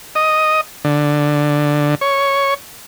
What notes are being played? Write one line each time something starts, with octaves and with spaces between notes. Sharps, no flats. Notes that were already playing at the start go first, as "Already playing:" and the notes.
D#5
D3
C#5